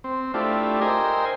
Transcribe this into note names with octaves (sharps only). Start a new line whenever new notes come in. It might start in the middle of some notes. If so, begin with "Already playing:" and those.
C4
A3 D4 E4 F4 G4
A#4 C5 D#5 G5 G#5